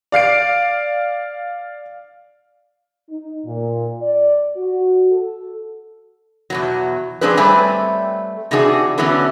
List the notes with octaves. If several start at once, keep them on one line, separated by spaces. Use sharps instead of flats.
D5 F5 C7 D7
D#4
A#2
D5
F#4
A4
E2 B2 F#3
F3 G#3 C4 D4 G#4 B4
G3 A3 C4 B4 C#5 G#5
C3 E3 D4 D#4 F#4 G#4
D3 E3 F#3 A3 B3 C#4